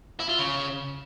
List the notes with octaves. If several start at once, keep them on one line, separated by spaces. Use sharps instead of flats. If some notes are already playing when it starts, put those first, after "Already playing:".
E4
F4
C#3